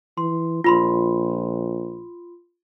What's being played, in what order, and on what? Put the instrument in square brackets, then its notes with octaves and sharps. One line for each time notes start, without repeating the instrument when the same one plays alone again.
[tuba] E3 [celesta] C6
[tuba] A#1 [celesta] F4 B5 C6